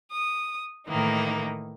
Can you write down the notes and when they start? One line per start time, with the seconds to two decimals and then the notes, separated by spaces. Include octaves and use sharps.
0.11 D#6
0.86 A2 D#3 E3 A#3 D#4